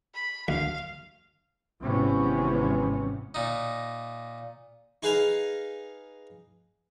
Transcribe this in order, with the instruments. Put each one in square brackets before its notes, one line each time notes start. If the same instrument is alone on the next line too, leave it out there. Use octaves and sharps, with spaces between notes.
[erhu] B5
[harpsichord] D2 [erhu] F5
[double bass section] G#1 G#2 C3 E3 B3 C#4
[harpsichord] A#2 D#4
D#4 G#4 B4 F5 G#5 A#5